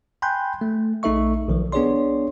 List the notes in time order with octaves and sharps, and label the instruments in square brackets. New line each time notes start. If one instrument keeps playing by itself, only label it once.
[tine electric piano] G5 G#5 B5 C6 F#6 G6
A3
A#1 A3 D#4 A4 E5 C#6
B1 D#3 F3
B3 D4 G#4 C#5 D5 C6